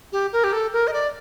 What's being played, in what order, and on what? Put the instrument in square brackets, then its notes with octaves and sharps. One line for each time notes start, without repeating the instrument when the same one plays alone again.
[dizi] G4
A#4
G4
A4
A#4
D#5
D5